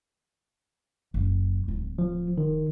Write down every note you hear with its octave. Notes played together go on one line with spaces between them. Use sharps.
F#1
D1
F3
D#3